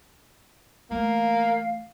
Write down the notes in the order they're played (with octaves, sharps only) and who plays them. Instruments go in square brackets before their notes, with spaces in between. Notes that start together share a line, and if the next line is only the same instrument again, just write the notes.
[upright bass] E3 A3 [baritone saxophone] A#3 [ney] F5